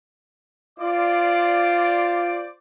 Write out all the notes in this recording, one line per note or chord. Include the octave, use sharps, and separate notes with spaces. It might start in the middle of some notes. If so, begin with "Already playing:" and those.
F4 C5 D5 D6